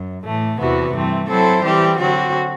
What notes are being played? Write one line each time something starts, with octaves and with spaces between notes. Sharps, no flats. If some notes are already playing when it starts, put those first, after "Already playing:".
Already playing: F#2
A2 E3 A3
E2 C3 E3 B3 F#4
G2 E3 A3 C4
F#3 C4 E4 A4 C5
E3 G3 C4 G4
D3 F#3 C4 F#4